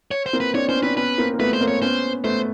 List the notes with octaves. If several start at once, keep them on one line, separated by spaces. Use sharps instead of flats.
C#5
C5
A#3 C4
B4
C4 D4 C#5
B3 C#4 C5
C4 D4 B4
B3 C#4 B4
A#3 C4
A#3
A3 B3 B4
C5
A#3 C4
C#5
B3 C#4 C5
A3 B3 C5